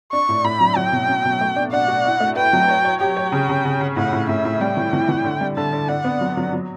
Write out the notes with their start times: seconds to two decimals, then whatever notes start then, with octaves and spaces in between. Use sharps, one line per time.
0.12 D4 C#6
0.29 A2
0.44 A2 B5
0.61 F#3
0.76 F#3 G5
0.92 B2
1.08 C#4
1.25 B2
1.41 A3
1.56 D4
1.72 D4 F#5
1.88 F#4
2.05 E4
2.20 A3
2.36 B4 G5
2.53 F#3
2.68 C#5
2.85 C#5
3.01 G4 G5
3.17 C#5
3.32 C#3
3.49 C#3
3.65 C#3
3.81 C#3
3.97 A2 F#5
4.13 A2
4.29 A2 E5
4.45 A2
4.61 G3 G5
4.77 E3
4.93 E3
5.09 E3
5.25 D3
5.41 G3
5.57 D3 A5
5.73 D3
5.89 D4 F#5
6.04 B3
6.21 F#3
6.37 F#3
6.53 F#3